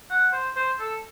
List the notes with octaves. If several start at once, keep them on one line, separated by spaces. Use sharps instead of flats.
F#5
C5
C5
A4